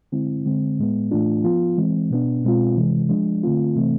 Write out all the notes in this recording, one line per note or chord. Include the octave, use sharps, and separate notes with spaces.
D3 G#3 C4 E4
D3 G#3 C4
A2 G#3 B3
A2 E3 A3 D4 F4
F3 B3 F4
E3 G#3 C4
B2 B3 D4
B2 G#3 C4 F4
C3 E3 G#3
F3 G#3 D4
D3 A3 C4 F4
C3 E3 A3 C4